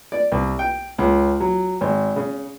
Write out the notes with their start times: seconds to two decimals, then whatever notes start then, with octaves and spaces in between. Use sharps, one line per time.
0.12 D5
0.32 C2
0.59 G5
0.98 C#2
1.40 F#3
1.81 G#1
2.16 C#3